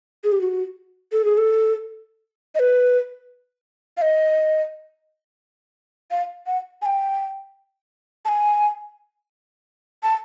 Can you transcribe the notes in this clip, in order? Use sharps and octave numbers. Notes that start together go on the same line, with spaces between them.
G#4
G4
F#4
A4
G#4
A4
D#5
B4
F5
D#5
F5
F#5
G#5
G5
A5
G#5
A5